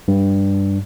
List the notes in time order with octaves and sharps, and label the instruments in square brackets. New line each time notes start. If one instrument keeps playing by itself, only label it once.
[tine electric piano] G2